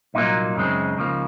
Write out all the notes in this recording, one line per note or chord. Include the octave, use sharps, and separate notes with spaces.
C2 A#2 F#3 A#3 D#4
F#2 C#3 G#3 C4
C#2 C#3 F3 A#3